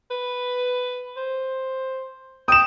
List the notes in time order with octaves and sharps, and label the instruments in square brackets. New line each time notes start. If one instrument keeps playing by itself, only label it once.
[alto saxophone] B4
C5
[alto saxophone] G5 [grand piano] D#6 E7